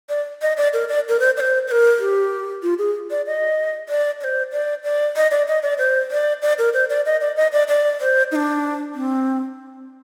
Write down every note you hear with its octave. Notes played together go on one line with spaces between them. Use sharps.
D5
D#5
D5
A#4
D5
A#4
C5
D5
C5
C5
A#4
G4
F4
G#4
D5
D#5
D5
D5
C5
D5
D5
D#5
D5
D#5
D5
C5
D5
D5
A#4
C5
D5
D#5
D5
D#5
D5
D5
C5
D#4
D4
C4